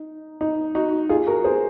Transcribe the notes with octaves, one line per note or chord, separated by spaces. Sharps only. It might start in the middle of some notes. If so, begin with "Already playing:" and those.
Already playing: D#4
D#4
D#4 F#4
F4 G#4
F#4 A#4
G#4 C5